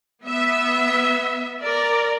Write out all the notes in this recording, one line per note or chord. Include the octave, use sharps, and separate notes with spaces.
B3 E5
A#4 D5